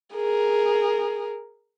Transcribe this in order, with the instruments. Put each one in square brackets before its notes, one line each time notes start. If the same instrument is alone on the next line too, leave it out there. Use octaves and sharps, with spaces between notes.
[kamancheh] G#4 A#4